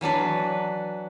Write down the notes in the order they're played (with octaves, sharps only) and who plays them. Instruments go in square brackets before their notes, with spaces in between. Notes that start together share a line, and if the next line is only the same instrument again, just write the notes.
[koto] E3 F#3 D4 B4